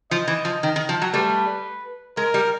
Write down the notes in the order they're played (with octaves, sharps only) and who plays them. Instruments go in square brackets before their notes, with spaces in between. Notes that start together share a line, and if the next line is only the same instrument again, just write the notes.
[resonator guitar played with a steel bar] F3 [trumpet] D#5
[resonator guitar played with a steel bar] E3
F3
D#3
D#3
F3
F#3
[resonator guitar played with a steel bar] G3 A3 [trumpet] B4
[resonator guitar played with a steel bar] G#3 [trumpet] A#4
[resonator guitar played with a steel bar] G3